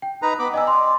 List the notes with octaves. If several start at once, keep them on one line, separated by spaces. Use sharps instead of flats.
G5
D#4 B4 A#5
B3 B5 D6
D5 D#5 G#5 E6
C6